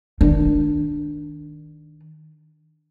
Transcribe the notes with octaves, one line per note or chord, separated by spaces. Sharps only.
D#3 D4